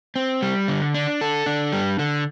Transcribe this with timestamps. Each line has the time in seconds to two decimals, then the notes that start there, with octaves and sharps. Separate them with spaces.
0.16 C4
0.42 G3
0.68 D3
0.94 D4
1.21 A4
1.46 D4
1.72 G3
1.99 D3